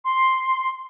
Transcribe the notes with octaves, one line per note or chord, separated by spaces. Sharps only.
C6